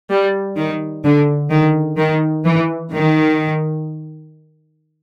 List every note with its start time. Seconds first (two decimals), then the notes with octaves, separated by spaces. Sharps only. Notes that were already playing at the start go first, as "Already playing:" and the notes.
0.10 G3
0.57 D#3
1.04 D3
1.50 D#3
1.98 D#3
2.45 E3
2.92 D#3